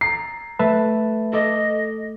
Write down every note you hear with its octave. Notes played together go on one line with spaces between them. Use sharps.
A#5 C7
A3 B4 E5 A5
A4 D#5 D6 D#6